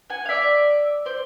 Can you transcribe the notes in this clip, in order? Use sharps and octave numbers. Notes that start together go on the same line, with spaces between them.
F#5 G#5
F5
D5 E5
C5 D5